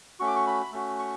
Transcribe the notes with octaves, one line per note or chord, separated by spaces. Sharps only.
A3 C#4 F#4 C#6
D6
C#6
B5
A3 C#4 F#4
C#6